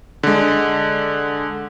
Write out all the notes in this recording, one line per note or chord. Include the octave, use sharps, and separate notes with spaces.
D3 G#3